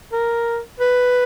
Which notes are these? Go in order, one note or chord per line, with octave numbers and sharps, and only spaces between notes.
A#4
B4